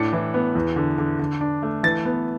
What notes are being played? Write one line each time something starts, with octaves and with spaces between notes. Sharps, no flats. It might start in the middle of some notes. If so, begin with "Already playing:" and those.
Already playing: A2 D4 C#7
E3
B3
E2
D3
D3
D3
D4
A3
E3 A6
B3